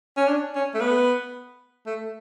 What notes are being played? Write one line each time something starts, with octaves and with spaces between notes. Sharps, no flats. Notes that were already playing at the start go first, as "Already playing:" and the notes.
C#4
D4
C#4
A3
B3
A3